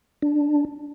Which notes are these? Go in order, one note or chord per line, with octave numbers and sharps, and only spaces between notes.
D4